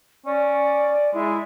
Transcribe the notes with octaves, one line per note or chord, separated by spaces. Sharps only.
C#4 D5
G#3 E4